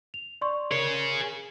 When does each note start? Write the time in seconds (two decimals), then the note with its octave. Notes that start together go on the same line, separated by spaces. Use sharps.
0.14 F7
0.41 D5 C6 C#6
0.71 G#4 A#4 C#5